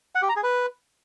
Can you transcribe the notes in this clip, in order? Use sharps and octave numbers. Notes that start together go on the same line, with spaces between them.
F#5
G4
A#5
G#4
B4